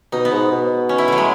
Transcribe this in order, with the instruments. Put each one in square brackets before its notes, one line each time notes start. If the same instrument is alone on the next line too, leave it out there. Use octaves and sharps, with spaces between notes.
[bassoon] B2 [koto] D#4
[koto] B3
[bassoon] G#2
B2
[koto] C#4
E4
F#3 A3
G#3